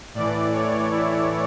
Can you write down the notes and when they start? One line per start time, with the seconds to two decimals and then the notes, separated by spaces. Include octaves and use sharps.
0.14 A2 E3 D5
0.52 C#5
0.91 E4